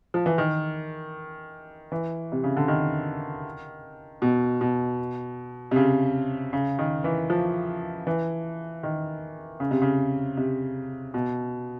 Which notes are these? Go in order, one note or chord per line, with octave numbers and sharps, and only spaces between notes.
F3
E3
D#3
E3
C3
C#3
D3
D#3
B2
B2
C3
C#3
C#3
D#3
E3
F3
E3
D#3
C#3
C3
C#3
C3
B2